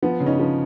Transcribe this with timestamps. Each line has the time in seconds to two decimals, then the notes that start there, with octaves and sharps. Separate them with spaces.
0.02 F3 B3
0.20 C#3
0.26 C#4 D#4
0.39 F3